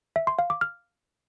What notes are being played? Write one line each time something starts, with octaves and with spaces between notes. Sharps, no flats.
E5
C6
F5
D6
F6